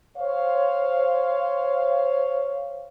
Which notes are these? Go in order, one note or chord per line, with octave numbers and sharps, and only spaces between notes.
C5 C#5 F5